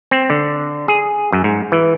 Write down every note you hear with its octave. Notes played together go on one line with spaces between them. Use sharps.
C4
D3
G#4
F#2
G#2
E3